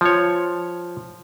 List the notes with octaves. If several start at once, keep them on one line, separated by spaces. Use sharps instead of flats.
F3 C#5